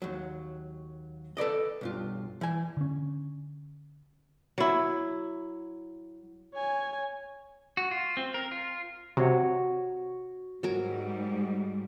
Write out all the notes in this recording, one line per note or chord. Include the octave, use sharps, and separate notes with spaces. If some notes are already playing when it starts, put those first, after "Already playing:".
D#2 F#3
A4 B4 D5 D#5
B1 G2 F4
E3 G#5
D3 C#4
F#3 E4
C#5 G#5
F#4
F4
C4
A#4
F4
C3 F#4 C#5 F#5
G#2 F#3 G3 A#4